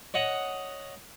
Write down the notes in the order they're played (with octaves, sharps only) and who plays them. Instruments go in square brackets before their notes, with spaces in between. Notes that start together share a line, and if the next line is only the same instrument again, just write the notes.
[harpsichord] C#5 D#5 F#5 D#6